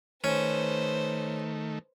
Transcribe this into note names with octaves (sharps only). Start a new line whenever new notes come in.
D#3 A3 C#4 B4 C5